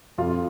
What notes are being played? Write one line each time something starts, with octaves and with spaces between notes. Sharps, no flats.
F2 F4